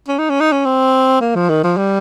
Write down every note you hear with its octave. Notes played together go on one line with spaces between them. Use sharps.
C#4
D#4
C#4
D#4
C#4
C4
A#3
F3
D#3
F3
G3